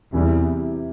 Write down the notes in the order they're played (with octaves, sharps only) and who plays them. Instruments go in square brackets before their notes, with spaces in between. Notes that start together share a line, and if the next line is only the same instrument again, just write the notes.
[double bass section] E2 [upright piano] C3 E3 G3